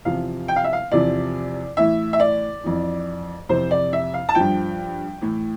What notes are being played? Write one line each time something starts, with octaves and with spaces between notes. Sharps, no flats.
E2 C3 F3 F5
G5
F5
E5
F5
E2 C3 F3 D5
A2 E3 E5
E5
D5
F2 E3
F2 C3 E3 C5
D5
E5
F5
A5
G2 F3 G5
A2 E3